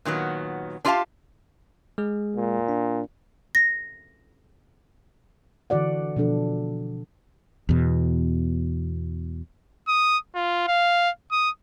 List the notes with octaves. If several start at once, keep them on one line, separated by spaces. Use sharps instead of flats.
A#2 D#3 F#3 B3
D4 F4 G4 D#5 F5 A5
G#3 G#4
A#2
D4
A#6
D3 E3 F#4 D5 F#5
B2 F3 D4 A4
E2 B2
D#6
F4
F5
D#6